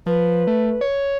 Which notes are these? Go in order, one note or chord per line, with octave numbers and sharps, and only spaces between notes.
F3 B4
A3
C#5